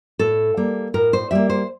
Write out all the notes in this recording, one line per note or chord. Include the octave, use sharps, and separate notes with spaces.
A2 A4
G3 A#3
A2 A#4
C5
G3 A#3 E5
C5